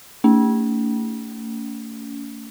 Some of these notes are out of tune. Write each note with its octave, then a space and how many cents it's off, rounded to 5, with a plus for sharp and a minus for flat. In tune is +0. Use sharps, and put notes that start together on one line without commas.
A3 +40 C#4 +40